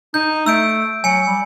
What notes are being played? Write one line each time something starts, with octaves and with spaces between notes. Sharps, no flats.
D#4 G6
A3 E6 G6 D7
F#3 G#5 C#7
G3